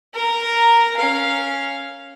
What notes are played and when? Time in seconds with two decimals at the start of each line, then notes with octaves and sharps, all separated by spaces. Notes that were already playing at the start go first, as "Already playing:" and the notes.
0.14 A#4 A#5
0.97 C#4 F5